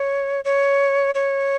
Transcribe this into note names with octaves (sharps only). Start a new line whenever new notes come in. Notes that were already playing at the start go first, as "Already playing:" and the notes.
Already playing: C#5
C#5
C#5